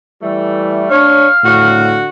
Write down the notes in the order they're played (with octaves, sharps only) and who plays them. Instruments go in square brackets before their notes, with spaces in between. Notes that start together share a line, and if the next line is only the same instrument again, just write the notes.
[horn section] E3 G3 A3
[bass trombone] D4 [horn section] C#5 [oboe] F5
[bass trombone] A2 [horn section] D3 F#4